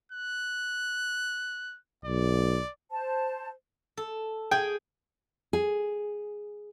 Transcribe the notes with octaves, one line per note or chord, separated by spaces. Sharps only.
F#6
B1 D5
C5 A5
A4
G#4 G5
G#4